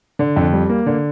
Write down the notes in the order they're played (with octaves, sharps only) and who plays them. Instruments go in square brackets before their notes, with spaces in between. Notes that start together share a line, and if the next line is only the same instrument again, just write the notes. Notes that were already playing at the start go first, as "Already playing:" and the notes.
[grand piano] D3
F2
G3
A#3
D3